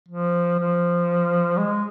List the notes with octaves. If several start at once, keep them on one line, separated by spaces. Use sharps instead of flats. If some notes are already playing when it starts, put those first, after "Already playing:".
F3
F3
G#3